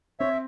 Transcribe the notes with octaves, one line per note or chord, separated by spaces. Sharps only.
C4 C#5 E5